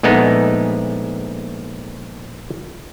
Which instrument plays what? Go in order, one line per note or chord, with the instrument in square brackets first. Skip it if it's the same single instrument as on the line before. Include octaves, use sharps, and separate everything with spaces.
[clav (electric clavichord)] A#1 G#3 A3 B3 D#4